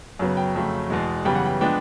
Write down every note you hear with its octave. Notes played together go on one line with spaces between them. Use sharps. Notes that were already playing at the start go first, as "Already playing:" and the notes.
F#2 C#3 F#3 B3
G5
F2 C#3 F#3 A3
E2 B2 G#3
F#2 C#3 E3 G3 B3 G5
F#5
G5
F3 G#3 B3 D4 G5